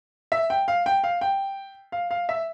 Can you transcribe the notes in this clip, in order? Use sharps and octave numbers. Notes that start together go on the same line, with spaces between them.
E5
G5
F5
G5
F5
G5
F5
F5
E5